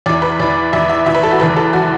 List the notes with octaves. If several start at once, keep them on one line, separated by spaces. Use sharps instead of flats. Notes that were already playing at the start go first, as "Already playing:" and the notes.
E2 E3 D5
B4
E2 E3 D5
E2 E3 E5
E5
E2 E3 E5
B4
A4
F#4
F#1 E2 E3 B4
A4
E3 F#4